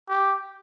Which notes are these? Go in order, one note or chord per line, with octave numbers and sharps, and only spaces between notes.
G4